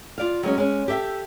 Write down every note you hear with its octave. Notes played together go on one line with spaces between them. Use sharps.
F4 D5 F5
F#3 G#3 C4 C#4
G#3 C#4
G4 A4 E5 G5